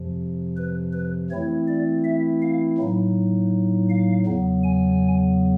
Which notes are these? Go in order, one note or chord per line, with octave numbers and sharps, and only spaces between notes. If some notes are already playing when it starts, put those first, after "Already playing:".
Already playing: F2 C3 F3
B4
B4
E3 A3 C4 E4 C#5
D5
E5
F5
A2 F#3 A#3 D#4
F5
E2 C#3 F#3 B3
G#5